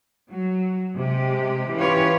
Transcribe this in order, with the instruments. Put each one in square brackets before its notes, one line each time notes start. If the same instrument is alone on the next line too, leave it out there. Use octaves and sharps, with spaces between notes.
[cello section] F#3
C3 G#3 G4
E3 C#4 F4 G4 B4 C#5